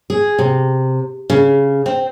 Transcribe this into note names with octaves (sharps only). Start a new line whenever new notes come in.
G#4
C3
C#3
C4